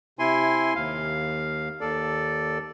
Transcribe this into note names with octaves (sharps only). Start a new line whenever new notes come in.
C3 E4 G#5 C6
D#2 F5
D#2 A4 D5